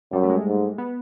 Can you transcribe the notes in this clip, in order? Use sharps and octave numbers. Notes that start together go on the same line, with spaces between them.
F#2 G3
A3
G#3
G#2
B3